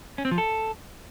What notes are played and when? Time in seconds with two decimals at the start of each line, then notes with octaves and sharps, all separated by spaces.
0.18 C#4
0.25 C4
0.31 F3
0.38 A4